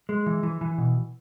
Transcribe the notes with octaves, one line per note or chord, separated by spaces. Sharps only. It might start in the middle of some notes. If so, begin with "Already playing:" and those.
G#3
E3
E3
E3
B2